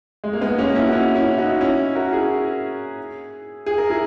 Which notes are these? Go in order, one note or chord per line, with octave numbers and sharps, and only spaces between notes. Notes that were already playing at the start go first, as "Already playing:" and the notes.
G#3
A#3
G#3 B3
A#3 C#4
C#4 E4
F#4
C#4 E4
C#4 E4
D#4 F#4
C#4 E4
F#4 A#4
E4 G#4
G#4
A#4
E4 G#4